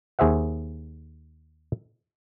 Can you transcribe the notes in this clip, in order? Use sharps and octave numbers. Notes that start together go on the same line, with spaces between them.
D#2 G#4 C5 E5 F#5